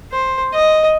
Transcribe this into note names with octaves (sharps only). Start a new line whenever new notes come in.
C5
D#5